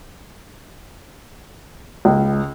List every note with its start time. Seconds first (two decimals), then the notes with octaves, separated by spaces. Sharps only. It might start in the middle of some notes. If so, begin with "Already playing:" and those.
2.05 C#2